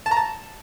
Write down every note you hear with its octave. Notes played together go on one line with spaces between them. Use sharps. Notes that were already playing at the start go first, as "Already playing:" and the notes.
A5
A#5
A5